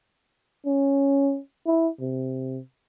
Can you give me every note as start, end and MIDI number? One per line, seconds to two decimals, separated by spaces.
0.66 1.39 61
1.66 1.89 64
2.01 2.60 48